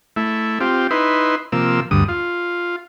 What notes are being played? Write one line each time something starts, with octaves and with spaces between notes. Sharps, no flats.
A3 E4
C4 F4 G4
D#4 E4 B4 C6
C3 F3 A#3 E6
D2 G2 D#6
F4